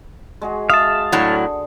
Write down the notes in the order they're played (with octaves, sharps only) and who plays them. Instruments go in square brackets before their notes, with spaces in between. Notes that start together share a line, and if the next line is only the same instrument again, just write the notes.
[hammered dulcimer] G#3 F#4 G#4
[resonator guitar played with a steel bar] E5 [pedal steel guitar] F5 A5 [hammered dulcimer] C6 [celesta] D#6
[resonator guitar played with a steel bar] A2 F#3 [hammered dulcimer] D3